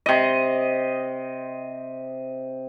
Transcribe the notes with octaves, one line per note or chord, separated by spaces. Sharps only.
C3 D#5